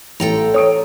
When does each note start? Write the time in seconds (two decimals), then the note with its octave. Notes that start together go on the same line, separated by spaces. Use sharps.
0.20 A1 A4 G5 A#5
0.54 C#5 D#6 D7